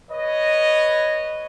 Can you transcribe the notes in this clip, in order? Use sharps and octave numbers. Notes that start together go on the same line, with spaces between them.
B4 C#5 D#5